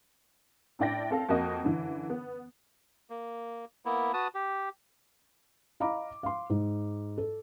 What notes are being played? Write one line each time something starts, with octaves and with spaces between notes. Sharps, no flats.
A2 D4 E4 D5 G5 A#6
C4 A4 F5
F2 A#3 F#4 D#5
F#2 D3 E3
B3
A#3
A#3 B3 E4
F#4 B4 A5 D#6
G4
D#5 F5 A#5 B5 D6
F5 C6
G#2
A4